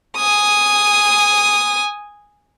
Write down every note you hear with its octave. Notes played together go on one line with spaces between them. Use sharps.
G#5 D#6